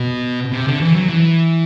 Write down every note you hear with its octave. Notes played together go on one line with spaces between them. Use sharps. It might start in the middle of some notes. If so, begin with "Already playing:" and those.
Already playing: B2
C3
D3
E3
F#3
E3